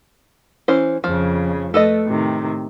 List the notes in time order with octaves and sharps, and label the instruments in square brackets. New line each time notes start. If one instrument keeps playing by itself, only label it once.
[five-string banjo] E3 C#4 C5
[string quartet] F2 C#3 [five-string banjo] F3
[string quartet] A3 [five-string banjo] A4 B4 D#5
[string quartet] A2 C3 D#3